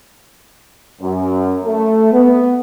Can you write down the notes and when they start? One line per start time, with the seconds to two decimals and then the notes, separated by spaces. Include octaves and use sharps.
1.01 F#2
1.63 A3
2.12 B3